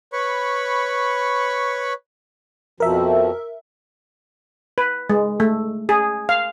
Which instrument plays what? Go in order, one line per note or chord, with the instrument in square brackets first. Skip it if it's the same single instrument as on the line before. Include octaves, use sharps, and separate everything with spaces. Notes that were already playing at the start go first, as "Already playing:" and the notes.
[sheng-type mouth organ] B4 C#5 B5 C#6
[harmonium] F2 B2 F3 [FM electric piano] A#4 E5
[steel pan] B4
G#3
A3
G#4
F5